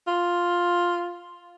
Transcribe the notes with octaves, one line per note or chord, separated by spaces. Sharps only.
F4